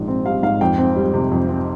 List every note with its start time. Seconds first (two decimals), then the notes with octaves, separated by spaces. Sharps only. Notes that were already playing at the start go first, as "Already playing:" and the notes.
Already playing: A#1 G#2
0.08 C4
0.25 G3 F5
0.43 G#2 F5
0.61 F2 G5
0.78 C4
0.96 G3
1.14 C3
1.31 F2
1.49 C4